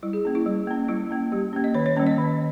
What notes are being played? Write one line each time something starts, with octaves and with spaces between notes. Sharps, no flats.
G3 E4
G#4
A#3 C#4
E4
G3
A#3 C#4
G3 E4
A#3 C#4
G3 G4
A#3 C#4
D#5
D#3 C#5
C#5
G3 A#3 C#4
D#5
D#3